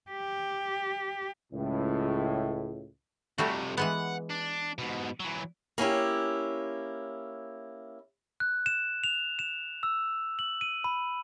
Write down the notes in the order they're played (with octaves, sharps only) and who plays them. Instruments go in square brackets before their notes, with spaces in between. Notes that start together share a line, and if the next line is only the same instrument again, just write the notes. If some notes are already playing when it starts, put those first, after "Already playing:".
[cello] G4
[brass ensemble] C#2 A2
[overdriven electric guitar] F2 C3 [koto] G3 A3 F#4
[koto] E3 G#3 B3 [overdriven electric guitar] F#5
[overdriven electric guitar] D4
G#2 B2
E3 F#3
[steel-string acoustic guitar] A#3 C#4 E4 G4
[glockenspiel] F#6
E7
F7
E7
E6
F#7
D#7
B5